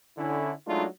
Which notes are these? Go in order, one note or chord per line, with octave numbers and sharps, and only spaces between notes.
D3 C#4 E4
F#3 G#3 A3 D4 D#4 F4